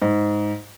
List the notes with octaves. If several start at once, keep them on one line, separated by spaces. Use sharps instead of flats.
G#2